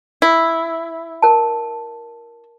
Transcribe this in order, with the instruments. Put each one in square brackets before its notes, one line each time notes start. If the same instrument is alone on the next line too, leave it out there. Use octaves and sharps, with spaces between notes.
[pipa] E4
[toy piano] A#4 A5